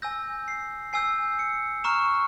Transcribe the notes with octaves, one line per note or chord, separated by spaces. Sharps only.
G#5 E6 G6 A#6
C7
G#5 E6 G6 C7
C#7
A#5 C#6 F6 E7